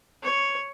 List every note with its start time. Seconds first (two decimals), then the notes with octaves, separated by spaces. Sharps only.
0.23 C#5